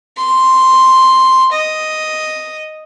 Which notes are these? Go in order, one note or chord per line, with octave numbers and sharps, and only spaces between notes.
C6
D#5